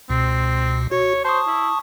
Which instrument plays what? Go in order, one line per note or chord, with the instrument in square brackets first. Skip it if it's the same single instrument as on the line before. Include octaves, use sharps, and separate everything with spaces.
[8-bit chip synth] C#2 B2 [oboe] C4
[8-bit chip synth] F#4 [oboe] C#5
[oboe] C5 [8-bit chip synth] A5 C#6 D#6
[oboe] E4